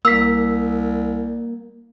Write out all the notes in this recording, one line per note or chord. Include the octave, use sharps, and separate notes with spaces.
C2 A#3 E6 B6